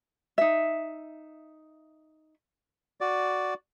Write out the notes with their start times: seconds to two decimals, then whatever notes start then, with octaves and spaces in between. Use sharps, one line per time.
0.38 D#4 E5
3.01 F#4 D5